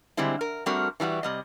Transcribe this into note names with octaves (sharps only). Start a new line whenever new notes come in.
D3 G3 G#3 C4 E4
A#4
G3 A3 C4 D4 F#4 A#4
E3 G3 D#4 F#4
C3 G3 D#5